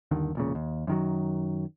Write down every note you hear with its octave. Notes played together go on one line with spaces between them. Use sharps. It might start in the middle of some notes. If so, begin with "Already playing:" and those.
G1 D#2 D3 D#3
E1 A#2 C#3
D#2
F#2 D#3 F#3